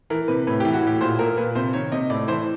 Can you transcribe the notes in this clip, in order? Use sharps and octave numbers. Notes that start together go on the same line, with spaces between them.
E3 A#4
C3 B4
A2 B4
E3 G4
F#4
A2 G4
A#2 C5
A#2 A#4
A#2 B4
C3 C5
D#3 C#5
C3 D#5
A2 D5
E3 C5